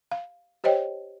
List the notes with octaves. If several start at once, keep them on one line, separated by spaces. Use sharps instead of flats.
F5
G4 C5 C#5 D#5 G5